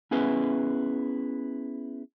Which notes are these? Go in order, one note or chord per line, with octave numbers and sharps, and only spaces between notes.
B3 C#4 E4 G#4 B4